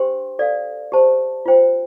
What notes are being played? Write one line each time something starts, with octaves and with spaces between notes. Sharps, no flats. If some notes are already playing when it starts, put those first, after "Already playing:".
Already playing: D4 G4 C5 G5 C6
A4 D5 F5
G4 C5 A5
F4 C5 G5